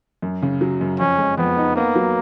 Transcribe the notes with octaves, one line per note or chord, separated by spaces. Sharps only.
F#2
C#3
F#3
F#2
F2 C#4
G#3
F2 B3
D#4
A#3 B3
F#3